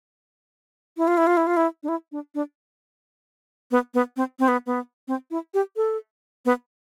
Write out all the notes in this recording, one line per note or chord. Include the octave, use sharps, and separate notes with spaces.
E4
F4
E4
F4
E4
F4
E4
D4
E4
D4
D4
B3
B3
C4
C4
B3
B3
C4
E4
G4
A4
B3